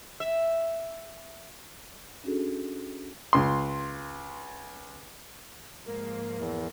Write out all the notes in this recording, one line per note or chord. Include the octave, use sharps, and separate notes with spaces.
E5
C#4 D4 F#4 G#4 A4
C#2 C6
G#2 F3 A#3 A#4
E2